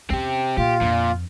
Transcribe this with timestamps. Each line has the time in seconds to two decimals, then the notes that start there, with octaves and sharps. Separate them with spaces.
0.10 E2 C4 C#4 G4
0.57 A#2 F4 G4
0.81 F2 A#2 D4